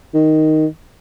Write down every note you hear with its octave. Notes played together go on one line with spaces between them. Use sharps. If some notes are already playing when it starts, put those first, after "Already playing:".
D#3